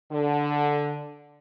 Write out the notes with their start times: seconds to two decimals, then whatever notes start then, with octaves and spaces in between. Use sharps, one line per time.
0.12 D3